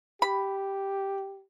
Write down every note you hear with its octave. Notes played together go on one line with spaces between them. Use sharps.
G4 B5